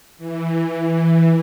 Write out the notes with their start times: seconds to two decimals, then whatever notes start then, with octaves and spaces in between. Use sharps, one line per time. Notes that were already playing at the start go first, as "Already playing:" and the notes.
0.18 E3